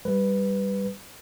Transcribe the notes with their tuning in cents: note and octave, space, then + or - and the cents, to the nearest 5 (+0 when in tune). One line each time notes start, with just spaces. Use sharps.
G3 +0 B4 +0